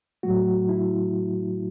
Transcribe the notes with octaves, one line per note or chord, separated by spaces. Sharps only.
A2 F#3 A3 F#4
E4